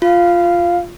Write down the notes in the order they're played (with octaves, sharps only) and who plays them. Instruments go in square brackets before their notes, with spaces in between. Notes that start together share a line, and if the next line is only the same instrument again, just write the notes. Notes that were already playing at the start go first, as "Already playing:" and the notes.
[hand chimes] F4 [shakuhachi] F5